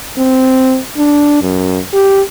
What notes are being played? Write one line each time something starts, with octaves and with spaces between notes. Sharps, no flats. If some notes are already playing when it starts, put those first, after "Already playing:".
C4
D4
F#2
G4